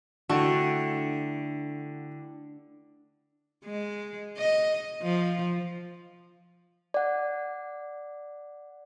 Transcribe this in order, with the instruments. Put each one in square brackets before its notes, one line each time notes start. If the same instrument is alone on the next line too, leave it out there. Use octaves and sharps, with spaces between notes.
[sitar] D3 [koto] A3 [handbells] D4 E4 G5 [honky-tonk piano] F#4
[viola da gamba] G#3
D#5
F3
[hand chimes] D5 F#5